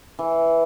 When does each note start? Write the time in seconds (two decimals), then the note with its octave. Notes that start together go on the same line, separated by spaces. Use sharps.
0.19 E3